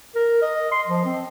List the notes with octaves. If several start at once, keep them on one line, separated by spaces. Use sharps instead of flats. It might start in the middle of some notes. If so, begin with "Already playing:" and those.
A#4
D#5
C6
F3
C4